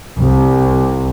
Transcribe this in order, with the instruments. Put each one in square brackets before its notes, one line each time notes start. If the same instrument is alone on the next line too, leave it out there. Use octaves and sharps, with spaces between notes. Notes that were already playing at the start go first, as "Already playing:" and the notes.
[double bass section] C2